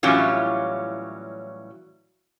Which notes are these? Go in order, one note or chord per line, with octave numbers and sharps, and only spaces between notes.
A2 E3 F#3 G3 C#4 F4